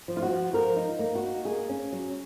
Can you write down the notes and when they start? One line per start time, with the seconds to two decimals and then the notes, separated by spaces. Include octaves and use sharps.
0.08 F3
0.17 F4
0.23 F#4
0.30 F3
0.53 F3 A#4
0.76 D#4
0.99 A#3
1.15 F#4
1.23 D#4
1.45 A#3 G#4
1.69 C#4
1.93 F#3